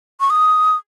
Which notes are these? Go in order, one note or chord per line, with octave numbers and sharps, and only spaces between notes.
C#6
D#6